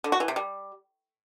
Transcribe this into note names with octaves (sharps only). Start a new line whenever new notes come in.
D3
F#4
E3
C3
G3